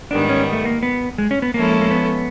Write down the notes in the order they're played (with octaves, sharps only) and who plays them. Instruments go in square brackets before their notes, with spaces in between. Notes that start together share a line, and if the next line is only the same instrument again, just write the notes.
[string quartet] G#2 D#3 G3 B3 [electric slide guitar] D4
[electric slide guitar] C#4
A3
A#3
B3
G#3
C#4
B3
[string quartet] F3 G#3 C#4 E4 A4 [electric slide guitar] A#3
[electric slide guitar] A#3
B3